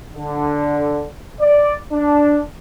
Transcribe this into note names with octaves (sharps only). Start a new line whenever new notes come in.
D3
D5
D4